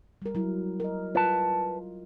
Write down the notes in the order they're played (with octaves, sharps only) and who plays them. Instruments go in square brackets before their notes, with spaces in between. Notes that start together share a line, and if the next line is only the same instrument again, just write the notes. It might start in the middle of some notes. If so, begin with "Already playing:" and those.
[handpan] G3 A#4
F#3 E4
A#4 D#5
[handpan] F4 [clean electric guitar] B4 A5